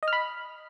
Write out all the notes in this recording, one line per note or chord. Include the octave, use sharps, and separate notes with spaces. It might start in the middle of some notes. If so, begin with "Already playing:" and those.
D#5
F6
B5